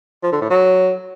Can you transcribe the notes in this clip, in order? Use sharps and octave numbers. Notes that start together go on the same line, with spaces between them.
F3
D3
A2
F#3